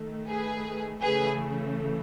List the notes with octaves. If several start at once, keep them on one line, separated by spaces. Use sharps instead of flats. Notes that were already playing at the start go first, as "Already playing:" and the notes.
Already playing: D#3 A3
G#4 B4
C#3 E3 A3 G#4 B4